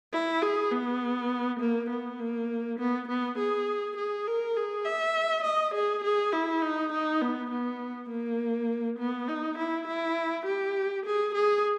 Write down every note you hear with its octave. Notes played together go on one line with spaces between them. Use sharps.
E4
G#4
B3
A#3
B3
A#3
B3
B3
G#4
G#4
A#4
G#4
E5
D#5
G#4
G#4
E4
D#4
D#4
B3
B3
A#3
B3
D#4
E4
E4
G4
G#4
G#4